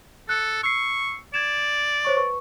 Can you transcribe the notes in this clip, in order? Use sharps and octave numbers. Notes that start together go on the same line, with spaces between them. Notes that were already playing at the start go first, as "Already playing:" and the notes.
A4 F#6 C#7
C#6 E6 C7
D5 G#6 E7
C5 C#5 C#6
B4 C#6